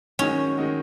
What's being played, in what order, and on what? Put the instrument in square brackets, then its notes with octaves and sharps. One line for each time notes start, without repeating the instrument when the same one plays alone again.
[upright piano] F#2 D#3 G#3 D#4 F#4 [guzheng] C#4
[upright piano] D#3 G#3 D#4 F#4